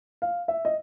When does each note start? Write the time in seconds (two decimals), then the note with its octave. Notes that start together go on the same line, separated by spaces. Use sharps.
0.22 F5
0.48 E5
0.65 D#5